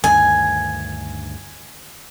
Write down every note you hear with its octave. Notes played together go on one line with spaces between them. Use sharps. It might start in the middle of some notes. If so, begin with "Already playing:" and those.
D2 G2 D#3 G#5